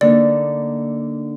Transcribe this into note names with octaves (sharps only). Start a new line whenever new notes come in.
D3 A#3 D#4 D5